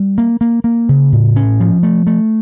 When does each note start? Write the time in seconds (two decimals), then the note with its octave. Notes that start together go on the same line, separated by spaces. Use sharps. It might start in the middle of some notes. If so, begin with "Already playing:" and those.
Already playing: G3
0.18 A#3
0.41 A#3
0.64 A#3
0.89 C#3
1.12 A2
1.36 C#4
1.60 F3
1.83 A3
2.07 A3